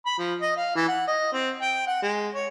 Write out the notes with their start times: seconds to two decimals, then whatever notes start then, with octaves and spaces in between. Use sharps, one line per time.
0.06 B5
0.18 F3
0.41 D#5
0.57 F5
0.76 E3
0.88 F#5
1.08 D#5
1.33 C4
1.61 G5
1.87 F#5
2.02 G#3
2.35 C#5